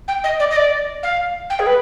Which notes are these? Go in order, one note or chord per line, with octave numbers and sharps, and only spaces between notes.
G5
D#5
D5
D#5
D5
F5
G5
G#4
B4